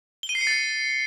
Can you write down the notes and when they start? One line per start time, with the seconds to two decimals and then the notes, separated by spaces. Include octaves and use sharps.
0.23 G7
0.29 D#7
0.35 C7
0.41 C#7
0.47 A6